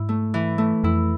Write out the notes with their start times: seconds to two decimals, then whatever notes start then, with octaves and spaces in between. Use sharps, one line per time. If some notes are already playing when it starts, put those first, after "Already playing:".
Already playing: G#2 E4
0.09 A3
0.34 E3
0.58 A3
0.84 F2 E4